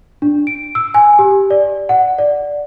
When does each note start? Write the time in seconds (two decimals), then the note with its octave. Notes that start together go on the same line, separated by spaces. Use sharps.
0.22 D4
0.47 D7
0.75 E6
0.94 G#5
1.19 G4
1.50 D5
1.89 F#5
2.18 D5